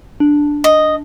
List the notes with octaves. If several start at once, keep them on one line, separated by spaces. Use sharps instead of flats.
D4
D#5